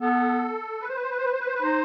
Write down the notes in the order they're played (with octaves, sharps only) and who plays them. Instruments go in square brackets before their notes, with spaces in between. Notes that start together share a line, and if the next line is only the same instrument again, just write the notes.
[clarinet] B3 [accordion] A4
[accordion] B4
C5
B4
C5
B4
C5
B4
C5
B4
C5
B4
[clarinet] D#4 [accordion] C5